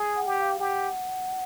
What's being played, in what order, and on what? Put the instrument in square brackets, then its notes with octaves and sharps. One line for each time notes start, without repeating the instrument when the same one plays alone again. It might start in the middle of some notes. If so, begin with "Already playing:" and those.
Already playing: [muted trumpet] G#4
[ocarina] F#5
[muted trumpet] G4
[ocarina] F#5
F5
[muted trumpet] G4 [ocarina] F#5